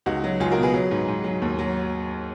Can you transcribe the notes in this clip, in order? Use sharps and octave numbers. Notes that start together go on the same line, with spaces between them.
C#2 D#4 F#4
F#3
C#2 F4 G#4
F#4 A#4
B2
G#4 B4
F#3
G#2
G#2
F#3
D#2
F#3